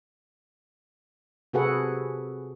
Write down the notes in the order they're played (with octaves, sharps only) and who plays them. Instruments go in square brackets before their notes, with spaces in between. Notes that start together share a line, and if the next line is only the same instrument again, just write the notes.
[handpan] C3 F#4 G#4 A4 B4 F#5